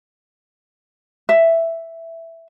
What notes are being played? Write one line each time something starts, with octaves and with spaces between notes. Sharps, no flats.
E5